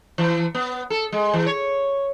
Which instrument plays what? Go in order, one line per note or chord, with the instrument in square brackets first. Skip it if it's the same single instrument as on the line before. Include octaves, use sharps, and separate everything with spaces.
[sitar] E3
B3
A4
G#3
E3
C#5